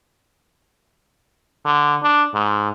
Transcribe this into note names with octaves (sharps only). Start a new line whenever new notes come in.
D3
D4
G#2